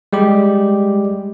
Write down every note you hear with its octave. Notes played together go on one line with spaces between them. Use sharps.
G3 G#3 G4